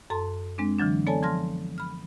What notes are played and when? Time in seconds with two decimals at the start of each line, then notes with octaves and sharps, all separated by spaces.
0.10 F#2 A4 A5 C6
0.58 G#3 C4 D4
0.78 D3 E3 F#3 D4
1.07 B3 A4 C#5 D5 G#5 A5
1.23 F3 A5 C6 F6 A#6
1.78 B5 F6